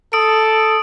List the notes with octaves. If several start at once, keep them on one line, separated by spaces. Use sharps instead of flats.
A4 D#6 D7